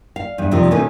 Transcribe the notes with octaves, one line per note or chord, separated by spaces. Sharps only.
F5
E2 G2
F2 C3 D#3 F3
B2 D#3 E3 A3 B3 C#4